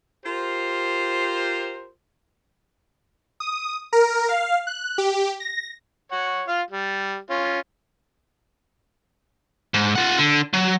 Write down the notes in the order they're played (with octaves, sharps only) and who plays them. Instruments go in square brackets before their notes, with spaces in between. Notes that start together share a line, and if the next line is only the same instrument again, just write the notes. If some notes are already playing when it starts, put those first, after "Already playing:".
[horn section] F4 G4 A#4 C5
[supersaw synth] D#6
A#4
F5
F#6
G4
A#6
[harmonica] C#5 F#5
F4 F5
G3
C#4 F4
[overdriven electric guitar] G#2
F4 F#5
D3
F#3